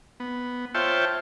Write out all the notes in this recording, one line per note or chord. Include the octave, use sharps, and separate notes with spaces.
B3
F4 C5 C#5 E5 G5 A5